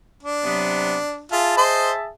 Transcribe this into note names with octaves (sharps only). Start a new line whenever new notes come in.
D4
C3 F#3 B3
F4 G#4 E5 A5
C5 D#5 C6